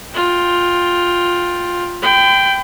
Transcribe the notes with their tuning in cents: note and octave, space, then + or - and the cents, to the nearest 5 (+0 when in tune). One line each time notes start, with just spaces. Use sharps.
F4 +10 G5 +0
G5 +0 B5 +45